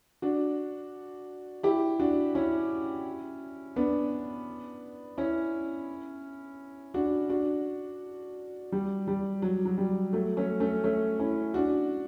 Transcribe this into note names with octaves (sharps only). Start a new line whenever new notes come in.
D4 F#4
E4 G4
D4 F#4
C#4 E4
B3 D4
C#4 E4
D4 F#4
D4 F#4
G3
G3
F#3
F#3
G3
F#3 A3
A3 C#4
A3 C#4
A3 C#4
C#4 E4
D4 F#4